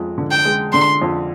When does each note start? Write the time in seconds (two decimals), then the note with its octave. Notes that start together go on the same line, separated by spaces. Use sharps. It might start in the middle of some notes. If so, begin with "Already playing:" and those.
Already playing: F2 G#3
0.18 D3
0.31 G5
0.45 G#3
0.73 D3 C6
1.02 F2